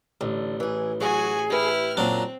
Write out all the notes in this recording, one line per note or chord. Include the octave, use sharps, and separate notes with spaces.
A1 D3
E3 G#4
F#3 F#4 G#4 G#5
E4 G4 B4 F6
F#2 A#2 F#3 C4 D4 A#5